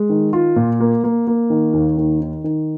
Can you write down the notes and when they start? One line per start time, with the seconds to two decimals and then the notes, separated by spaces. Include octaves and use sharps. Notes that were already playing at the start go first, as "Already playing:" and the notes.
Already playing: G#3
0.09 D#3
0.33 F4
0.56 A#2
0.80 A#3
1.04 A#3
1.27 A#3
1.50 D#3
1.73 D#2
1.97 D#3
2.21 D#3
2.44 D#3